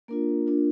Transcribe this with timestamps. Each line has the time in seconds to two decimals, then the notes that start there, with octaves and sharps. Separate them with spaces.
0.08 A#3 D4 F4 A#4
0.47 A#3 D4 F4